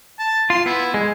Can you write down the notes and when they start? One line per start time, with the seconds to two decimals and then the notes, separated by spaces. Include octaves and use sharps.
0.19 A5
0.50 F4 C6
0.66 B3 E4
0.94 G#3